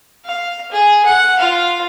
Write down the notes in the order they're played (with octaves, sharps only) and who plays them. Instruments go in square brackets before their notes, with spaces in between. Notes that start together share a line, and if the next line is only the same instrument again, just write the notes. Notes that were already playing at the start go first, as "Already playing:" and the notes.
[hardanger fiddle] F5
G#4
F#5
F4 F5